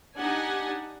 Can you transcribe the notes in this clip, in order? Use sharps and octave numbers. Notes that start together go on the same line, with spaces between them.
D4 D#4 G4 F#5 G#5